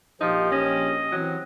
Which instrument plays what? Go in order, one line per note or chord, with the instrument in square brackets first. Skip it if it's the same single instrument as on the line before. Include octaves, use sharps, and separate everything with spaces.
[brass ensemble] A#1 G4 [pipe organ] F3 [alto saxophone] D#4
[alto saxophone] C#4 [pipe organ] D#5
[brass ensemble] E3 C4 [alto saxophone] F#3